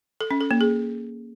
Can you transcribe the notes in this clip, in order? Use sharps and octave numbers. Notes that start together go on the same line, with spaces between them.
A4
C#4
A4
A#3
G#4